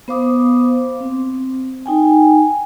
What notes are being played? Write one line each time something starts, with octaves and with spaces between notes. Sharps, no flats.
B3 C5 F5 D6 D#6
C4
D#4 G5 G#5